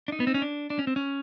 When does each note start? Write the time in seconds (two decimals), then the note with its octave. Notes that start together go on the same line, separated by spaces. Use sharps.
0.08 D4
0.12 D#4
0.20 B3
0.27 C4
0.34 C#4
0.42 D4
0.70 D4
0.79 C#4
0.87 C4
0.96 C#4